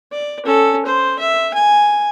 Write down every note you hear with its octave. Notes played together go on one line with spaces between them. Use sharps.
D5
C#4 A4
C5
E5
G#5